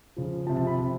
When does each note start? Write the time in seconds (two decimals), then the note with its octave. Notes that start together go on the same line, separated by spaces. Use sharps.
0.17 C#3 F3
0.47 F3 A5
0.49 C3
0.57 A5
0.67 B5
0.77 C3 F3